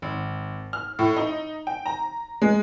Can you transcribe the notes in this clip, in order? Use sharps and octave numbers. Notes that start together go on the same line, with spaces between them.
G#1
F6
A2
D#4
G5
A#5
G#3